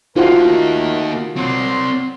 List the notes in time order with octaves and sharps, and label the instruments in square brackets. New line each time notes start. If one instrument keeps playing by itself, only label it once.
[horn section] A3 A#4 [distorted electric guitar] A#3 D#4 [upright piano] F4 F#4 F5
[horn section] F#3 C6 [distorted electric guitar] C4 D5